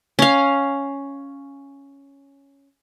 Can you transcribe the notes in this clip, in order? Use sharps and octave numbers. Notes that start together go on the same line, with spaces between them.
C#4 F5